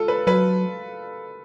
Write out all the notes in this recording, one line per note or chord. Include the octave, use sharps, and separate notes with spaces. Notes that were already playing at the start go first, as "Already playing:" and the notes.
Already playing: F4 A4
B4
F#3 B4